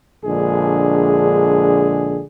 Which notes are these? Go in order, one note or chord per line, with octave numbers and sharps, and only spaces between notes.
A#1 D3 G#3 G#4